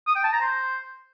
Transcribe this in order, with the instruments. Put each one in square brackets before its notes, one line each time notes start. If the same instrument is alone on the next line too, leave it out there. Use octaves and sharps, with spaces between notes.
[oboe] D#6
G5
A5
A#5
C5